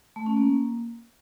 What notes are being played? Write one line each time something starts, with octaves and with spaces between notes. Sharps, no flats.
A3
C#4
A#3